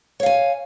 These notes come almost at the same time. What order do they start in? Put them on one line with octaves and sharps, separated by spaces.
C#5 F5 G#5